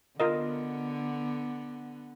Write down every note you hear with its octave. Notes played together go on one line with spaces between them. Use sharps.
D3 B3 F4 A#4 D#5